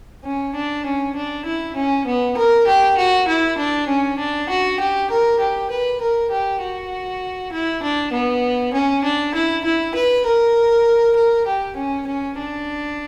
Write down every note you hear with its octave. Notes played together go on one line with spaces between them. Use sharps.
C#4
D4
C#4
D4
E4
C#4
B3
A#4
G4
F#4
E4
D4
C#4
D4
F#4
G4
A#4
G4
B4
A#4
G4
F#4
E4
D4
B3
C#4
D4
E4
E4
B4
A#4
A#4
G4
C#4
C#4
D4